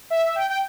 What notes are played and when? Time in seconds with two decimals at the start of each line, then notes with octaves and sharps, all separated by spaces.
0.10 E5
0.35 G5
0.50 G5